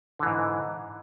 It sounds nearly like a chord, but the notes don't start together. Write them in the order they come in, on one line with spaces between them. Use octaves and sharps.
D3 E3 G#2